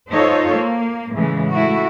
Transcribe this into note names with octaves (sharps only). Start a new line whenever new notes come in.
D#4 F4 A4 C5 C#5
A#3
A2 C#3 E3 G#3
A3 E4 F#4